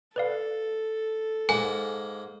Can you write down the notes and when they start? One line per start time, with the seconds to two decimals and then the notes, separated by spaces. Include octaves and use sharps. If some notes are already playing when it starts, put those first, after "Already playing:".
0.16 A4 B4 D5 F5
1.49 G#2 A#3 A#4 F#5 G#5